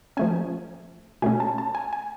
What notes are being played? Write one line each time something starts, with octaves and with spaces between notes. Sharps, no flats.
F3 A3 C#4 G#5
B2 A3 C#4 G#5
A5
A5
G#5
G#5